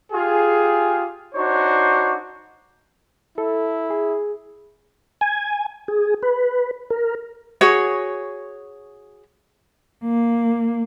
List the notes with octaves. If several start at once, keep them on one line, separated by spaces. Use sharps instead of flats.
F4 G4 G#4
D4 D#4 F#4 C5 C#5
E4 A4
G#4
G#5
G#4
B4
A#4
F#4 G#4 C#5
A#3